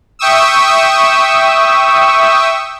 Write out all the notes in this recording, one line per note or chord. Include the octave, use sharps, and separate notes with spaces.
E5 G5 C#6 D#6 E6